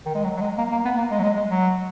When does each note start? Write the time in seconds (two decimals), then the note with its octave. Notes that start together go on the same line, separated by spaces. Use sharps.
0.06 D#3
0.15 G#3
0.24 F#3
0.37 F#3
0.41 G#3
0.58 A#3
0.71 A#3
0.85 B3
0.98 A#3
1.11 G#3
1.19 F#3
1.23 G#3
1.37 G#3
1.50 F#3